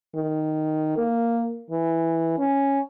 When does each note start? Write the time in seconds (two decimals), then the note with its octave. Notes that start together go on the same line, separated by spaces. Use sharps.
0.15 D#3
0.98 A#3
1.71 E3
2.38 C#4